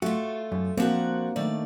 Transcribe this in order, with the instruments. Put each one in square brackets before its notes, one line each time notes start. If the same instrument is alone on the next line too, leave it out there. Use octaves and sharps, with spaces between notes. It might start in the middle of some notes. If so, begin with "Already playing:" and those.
[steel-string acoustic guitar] A3 F4 [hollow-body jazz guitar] F#4
[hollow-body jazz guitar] F#2
[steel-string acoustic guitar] F3 F#4 F#5 [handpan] A#3 [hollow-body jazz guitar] C4 D4
[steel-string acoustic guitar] D#3 A3 D5